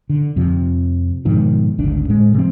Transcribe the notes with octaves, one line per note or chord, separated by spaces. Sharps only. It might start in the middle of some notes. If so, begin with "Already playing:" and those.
D3
F2 C3 F3
G#2 B2 D#3 F3
G#1 D2 C#3 D4
A2 G#3
C3 F3 C4